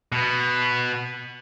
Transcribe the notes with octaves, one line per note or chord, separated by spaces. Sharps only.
B2 B3